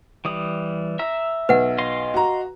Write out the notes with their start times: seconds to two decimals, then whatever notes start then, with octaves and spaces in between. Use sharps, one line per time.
0.25 E3 G3 D#6
0.99 E5 A#5 E6
1.49 B1 B4 F#5
1.78 D#5 F5 C6
2.14 F#4 A#5